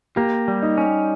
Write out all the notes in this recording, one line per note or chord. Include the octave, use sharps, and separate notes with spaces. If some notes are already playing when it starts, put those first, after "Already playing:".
A#3 G4
G3
D#4
C#4